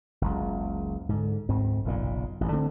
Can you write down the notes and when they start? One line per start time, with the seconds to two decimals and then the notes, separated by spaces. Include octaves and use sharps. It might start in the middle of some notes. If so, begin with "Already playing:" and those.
0.21 F#1 C#2
1.09 G#2 D3
1.49 D2 G#2 C4
1.85 F#1 B1 A#2
2.41 A1 G2
2.52 D3 A3 C4